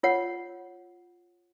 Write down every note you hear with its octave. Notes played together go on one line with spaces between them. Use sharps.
F4 C#5 F#5